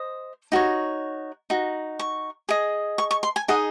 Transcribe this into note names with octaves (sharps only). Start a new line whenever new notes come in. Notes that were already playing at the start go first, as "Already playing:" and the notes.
Already playing: C5 D#5
D#4 F#4 C#5
D#4 F#4
C#6
G#4 D#5
C#6
C#6
C6
G#5
D#4 G#4 D#5 F#5